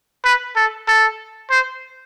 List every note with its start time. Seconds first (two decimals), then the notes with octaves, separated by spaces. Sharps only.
0.24 B4
0.56 A4
0.88 A4
1.51 C5